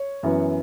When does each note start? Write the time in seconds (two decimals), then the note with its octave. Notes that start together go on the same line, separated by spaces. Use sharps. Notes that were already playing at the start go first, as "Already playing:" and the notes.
Already playing: C#5
0.23 F#2 E3 B3